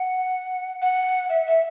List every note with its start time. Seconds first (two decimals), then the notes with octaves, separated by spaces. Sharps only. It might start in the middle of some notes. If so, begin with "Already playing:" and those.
Already playing: F#5
0.82 F#5
1.30 E5
1.47 E5